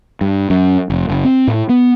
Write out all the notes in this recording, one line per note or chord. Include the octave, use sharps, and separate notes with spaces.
G2
F#2
F1
F#1
C4
A2
B3